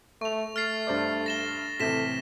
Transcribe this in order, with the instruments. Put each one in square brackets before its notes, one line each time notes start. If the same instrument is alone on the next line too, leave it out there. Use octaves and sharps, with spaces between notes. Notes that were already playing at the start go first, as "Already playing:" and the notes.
[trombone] A3 [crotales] C#6 F7
[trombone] A3 [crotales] F6 A6 C7
[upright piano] G2 C5 D5
[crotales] A#6 E7 G7
[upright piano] A2 C3 E3 [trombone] A4 [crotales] B6 E7